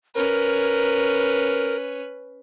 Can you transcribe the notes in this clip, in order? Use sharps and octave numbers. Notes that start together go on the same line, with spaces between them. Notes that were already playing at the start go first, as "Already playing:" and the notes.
C#4 A#4 B4